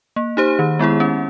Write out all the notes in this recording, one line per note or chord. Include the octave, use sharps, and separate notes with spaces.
A#3
D#4 G4 C5
D#3
G#3 B3 E4 G#4
C#4